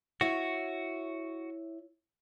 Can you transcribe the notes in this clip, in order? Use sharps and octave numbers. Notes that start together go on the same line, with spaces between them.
E4 F#4 C#5